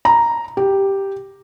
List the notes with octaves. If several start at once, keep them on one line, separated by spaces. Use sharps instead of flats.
A#5
G4